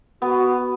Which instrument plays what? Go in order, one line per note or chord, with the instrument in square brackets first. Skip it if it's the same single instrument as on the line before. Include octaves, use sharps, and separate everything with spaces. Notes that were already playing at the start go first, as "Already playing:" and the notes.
[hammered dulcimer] B3 [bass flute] F#4